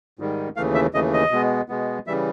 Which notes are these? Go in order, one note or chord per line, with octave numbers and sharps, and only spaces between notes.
G#2 D#3 G3
D#2 C#3 E3 A3 F5
E5
D#2 C#3 E3 A3 D#5
D#5
B2 G#3 B3
B2 G#3 B3
C#3 E3 G3 E5